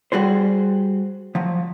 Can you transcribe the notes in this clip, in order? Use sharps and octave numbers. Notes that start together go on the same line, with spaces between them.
G3 F#4 G#4 C5
F3 F#3